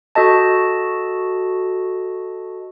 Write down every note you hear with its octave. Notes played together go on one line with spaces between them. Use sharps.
F#4 A4 D#5 A5